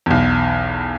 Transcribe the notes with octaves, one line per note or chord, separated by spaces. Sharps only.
B1 E2